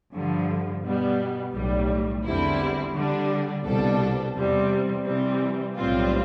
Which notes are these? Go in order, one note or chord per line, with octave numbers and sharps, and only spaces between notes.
G2 D3 F3
B2 G3 B3
B1 A2 G3
E2 D3 G3 C4 E4
D3 G3 D4
C2 B2 G3 D4 A4
E2 C3 G3 C4
C3 E3 G3 C4
B1 A2 G3 C4 F4